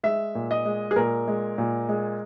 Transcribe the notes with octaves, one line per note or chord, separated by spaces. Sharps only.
G#3 E5
A#2
D#5
G#3
G#4
A#2 A#4
G#3
A#2
G#3